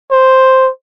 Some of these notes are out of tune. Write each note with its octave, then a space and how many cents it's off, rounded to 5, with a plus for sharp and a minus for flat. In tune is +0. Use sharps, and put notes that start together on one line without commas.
C5 +0